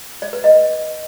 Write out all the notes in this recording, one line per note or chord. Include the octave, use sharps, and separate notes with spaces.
D5
B4
D#5